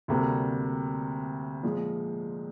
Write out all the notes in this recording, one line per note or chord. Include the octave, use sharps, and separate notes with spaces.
D2 C3 G3 A#3
A#2 F3 G#3